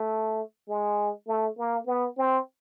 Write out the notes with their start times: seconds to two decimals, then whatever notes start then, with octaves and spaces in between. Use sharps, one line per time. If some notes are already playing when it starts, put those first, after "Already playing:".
Already playing: A3
0.69 G#3
1.27 A3
1.58 A#3
1.87 B3
2.17 C4